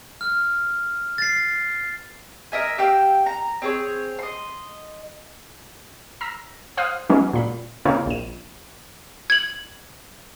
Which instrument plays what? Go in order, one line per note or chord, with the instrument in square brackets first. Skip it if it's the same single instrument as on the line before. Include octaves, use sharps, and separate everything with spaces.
[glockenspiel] F6
A6 C7
[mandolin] A#4 D#5 E5 G#5
G4 F5 G5 E6
A#5
C4 G#4 C#5
D#5 C6
[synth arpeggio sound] A#5 E6 A#6 B6
C5 F5 D#6 F6 F#6
E3 F#3 G#3 B3 C#4 D#4
A#2 B5
C#3 A#3 C4 D#4 E4 C#5
A#1 D#7
[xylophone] G#6 F#7